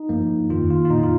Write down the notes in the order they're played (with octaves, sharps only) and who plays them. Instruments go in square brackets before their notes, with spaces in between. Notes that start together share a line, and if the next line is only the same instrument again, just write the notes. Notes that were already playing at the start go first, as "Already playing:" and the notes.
Already playing: [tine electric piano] D#4
G2 F3 A#3
F2 D#3 A#3 F4
F4
F4
A#2 A#3 D#4
F4